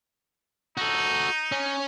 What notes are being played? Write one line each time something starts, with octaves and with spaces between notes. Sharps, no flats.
D#4 F#4 A4
C#4